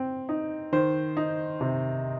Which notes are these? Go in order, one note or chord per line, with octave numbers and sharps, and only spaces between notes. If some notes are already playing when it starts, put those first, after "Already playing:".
Already playing: C4
D#4
D#3 C5
D#4
C3